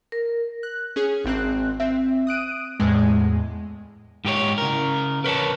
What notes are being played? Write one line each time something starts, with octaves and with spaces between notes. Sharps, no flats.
A#4
F#6
C#4 G#4
G#1 C4 F#6
C4 E5
D#6 F#6 D7 D#7
E2 A2 G#3
G#2 G4 A4 C#5
C#3 A#4
A#4 B4 C#5 A5